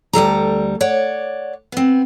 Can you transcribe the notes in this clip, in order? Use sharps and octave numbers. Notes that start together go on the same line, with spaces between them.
D2 G3 A4 A#5
C#5 D5 F#5
B3 C4